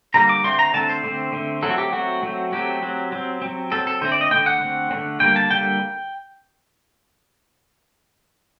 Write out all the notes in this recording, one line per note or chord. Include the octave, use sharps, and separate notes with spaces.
D3 G3 A#3 A#5
D6
D3 A3 C4 C6
A#5
D3 A3 C4 A5
C5
D3 A3 C4
D3 A3 C4
F#3 A3 C4 A4
F#4
G4
F#3 A3 C4 F#4
F#3 A3 C4
F#3 A3 C4 G4
F#3 C4
F#3 C4
F#3 C4
F#3 C4 A4
A4
D3 A3 C4 C5
D5
D#5
D3 A3 C4 G5
F#5
D3 A3 C4
D3 A3 C4
D3 G3 A#3 G5
A5
D3 G3 A#3 G5